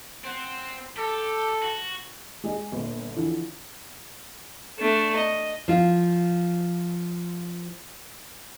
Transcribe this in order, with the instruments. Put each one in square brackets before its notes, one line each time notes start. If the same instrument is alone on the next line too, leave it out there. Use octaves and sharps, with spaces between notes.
[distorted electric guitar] C4 [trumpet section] C5 F#5
[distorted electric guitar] G4 [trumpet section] A4
[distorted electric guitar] F#4
[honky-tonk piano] G#3 G#4 D#5
G1 A#2
D3 E3 F3
[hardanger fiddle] A3 D4
D#5
[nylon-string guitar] F3 F4